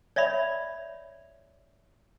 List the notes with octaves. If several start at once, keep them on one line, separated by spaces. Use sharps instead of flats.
C#5 D5 E5 B5